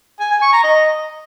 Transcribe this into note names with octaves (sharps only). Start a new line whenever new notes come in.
G#5
G#5
C#6
A#5
D#5